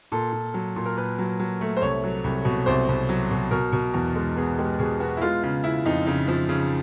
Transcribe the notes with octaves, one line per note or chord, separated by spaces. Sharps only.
A#2 A4
A#2
F#3
A#2
A#4
A#2 B4
F#3
F#3
A3
C5
C2 C#5
F#3
C2
B2
C2 C5
C2
F#3
B2
B2 A#4
B2
E2
G#3
B3 G#4
G#3 G4
B2 G#4
B3 F#4
E4
G#3 F4
C#3 F4
C#3 E4
F2 D#4
C#3 D#4
F3
C#3